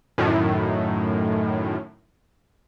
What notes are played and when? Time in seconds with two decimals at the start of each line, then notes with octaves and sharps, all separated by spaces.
0.18 F#2 A2 D#3